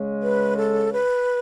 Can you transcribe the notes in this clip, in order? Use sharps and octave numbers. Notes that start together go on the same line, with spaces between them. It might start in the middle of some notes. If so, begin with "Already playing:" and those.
Already playing: C#3 G#3
B4
A4
B4